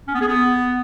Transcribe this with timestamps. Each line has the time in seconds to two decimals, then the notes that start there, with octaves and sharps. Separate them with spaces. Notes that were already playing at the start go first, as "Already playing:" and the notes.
0.08 C#4
0.14 B3
0.21 G#4
0.27 B3